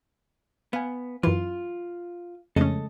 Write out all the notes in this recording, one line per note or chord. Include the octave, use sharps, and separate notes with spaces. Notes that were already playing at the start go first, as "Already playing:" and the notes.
B3 F5 G#5
F#2 E3 F4
F2 C#3 G#3 A3 C#4 A4 D#5